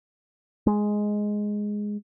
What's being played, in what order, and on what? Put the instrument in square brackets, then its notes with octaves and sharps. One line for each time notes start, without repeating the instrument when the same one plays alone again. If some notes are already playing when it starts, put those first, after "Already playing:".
[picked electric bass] G#3